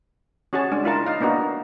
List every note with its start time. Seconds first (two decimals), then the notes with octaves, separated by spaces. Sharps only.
0.53 C#4 F#4 G#4 C#5 A5
0.72 G#3 D4
0.84 E4 F4 A#4 A5
1.06 D#4 F5
1.21 A#3 B3 D4 D#4 F#4